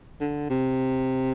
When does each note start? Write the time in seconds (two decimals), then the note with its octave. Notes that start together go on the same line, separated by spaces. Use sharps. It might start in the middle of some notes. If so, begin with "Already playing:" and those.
0.21 D3
0.50 C3